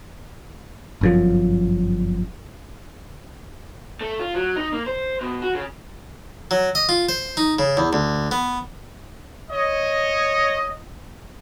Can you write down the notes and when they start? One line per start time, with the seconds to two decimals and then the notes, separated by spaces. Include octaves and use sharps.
1.01 G1 F#2 F3
4.01 A3
4.20 F4
4.34 F#3
4.56 D#4
4.72 A#3
4.86 C5
5.21 B2
5.42 F#4
5.55 C#3
6.51 F#3
6.75 D#5
6.89 F4
7.09 C5
7.37 D#4
7.59 C#3
7.77 E2
7.93 D2
8.31 B3
9.50 C#5 D#5